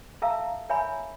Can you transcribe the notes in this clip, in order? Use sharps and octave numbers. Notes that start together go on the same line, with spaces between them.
A4 E5 F5 A5 A#5 E6
A#4 C#5 E5 G#5 A#5 B5